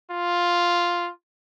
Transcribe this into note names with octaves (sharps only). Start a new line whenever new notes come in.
F4